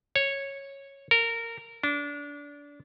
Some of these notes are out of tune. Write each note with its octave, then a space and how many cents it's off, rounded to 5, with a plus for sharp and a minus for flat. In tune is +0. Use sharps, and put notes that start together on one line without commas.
C#5 -10
A#4 -15
D4 -25